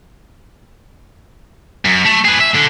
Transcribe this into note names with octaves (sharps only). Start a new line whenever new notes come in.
F#2
A3
G#4 B4
E5
D3